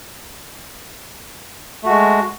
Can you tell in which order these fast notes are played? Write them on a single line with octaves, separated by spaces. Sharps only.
A3 F#4 G#3